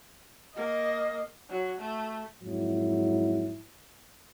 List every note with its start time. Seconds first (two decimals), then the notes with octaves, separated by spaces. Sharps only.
0.56 A#3 D#5
1.49 F#3
1.79 A3
2.41 F2 G#2 F#3 E4